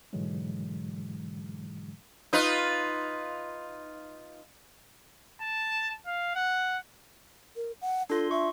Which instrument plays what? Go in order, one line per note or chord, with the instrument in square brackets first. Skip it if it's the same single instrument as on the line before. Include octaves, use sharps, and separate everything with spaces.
[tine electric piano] G#2 B2 D3 E3 F#3 G#3
[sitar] D#4 F4 B4
[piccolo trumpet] A5
F5
F#5
[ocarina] A#4
F#5
[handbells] D4 F4 C6 [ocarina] A4
[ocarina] E5 [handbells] C#6